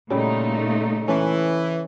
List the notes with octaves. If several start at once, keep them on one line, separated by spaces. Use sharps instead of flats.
A#2 C#3 G3 A3 D#4 E4
E3 C#4 A4 B4